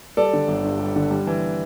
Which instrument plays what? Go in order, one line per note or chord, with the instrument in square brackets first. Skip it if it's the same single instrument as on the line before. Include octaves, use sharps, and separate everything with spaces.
[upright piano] G3 A4 D5
D3
G1
G2
G3
D3
G3
E3